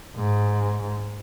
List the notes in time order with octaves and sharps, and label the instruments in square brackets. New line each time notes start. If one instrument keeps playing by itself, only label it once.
[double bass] G#2